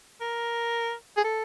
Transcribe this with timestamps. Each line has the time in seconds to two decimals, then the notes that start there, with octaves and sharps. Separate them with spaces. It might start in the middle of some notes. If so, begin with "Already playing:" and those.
0.21 A#4
1.17 G#4
1.24 A4